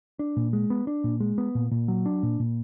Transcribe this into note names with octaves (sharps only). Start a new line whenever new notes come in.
D4
A#2
G#3
B3
D4
A#2
G#3
B3
A#2
A#2
F#3
D4
A#2
A#2